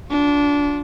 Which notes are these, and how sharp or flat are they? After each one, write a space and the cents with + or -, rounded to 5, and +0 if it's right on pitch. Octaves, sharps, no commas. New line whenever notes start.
D4 -20 F4 +30